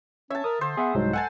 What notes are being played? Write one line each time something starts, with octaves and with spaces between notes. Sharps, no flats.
C#4 C#5 E5 A5
A#4 D#6
D3 C5
B3 G#4 E5 F#5
C2 G#2 F#3 G#3
A4 F#5 G#5 A5